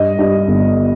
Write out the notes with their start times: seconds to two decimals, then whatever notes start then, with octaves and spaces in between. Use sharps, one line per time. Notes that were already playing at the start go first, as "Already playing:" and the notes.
Already playing: G2 D#5
0.19 G2
0.48 G1